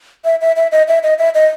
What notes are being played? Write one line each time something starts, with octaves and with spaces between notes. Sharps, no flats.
E5
E5
E5
D#5
E5
D#5
E5
D#5